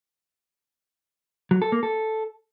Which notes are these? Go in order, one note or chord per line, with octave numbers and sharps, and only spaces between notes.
F#3
A4
A#3
A4